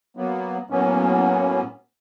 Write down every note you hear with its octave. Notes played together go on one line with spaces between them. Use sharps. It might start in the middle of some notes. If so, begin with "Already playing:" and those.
F#3 A#3 B3
A2 F#3 A#3 B3 C#4